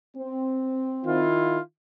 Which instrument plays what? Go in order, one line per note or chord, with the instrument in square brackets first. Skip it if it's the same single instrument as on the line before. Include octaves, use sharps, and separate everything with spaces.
[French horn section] C4
[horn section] D#3 E4 F4